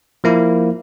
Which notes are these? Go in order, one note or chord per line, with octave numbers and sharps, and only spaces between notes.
F3 A#3 E4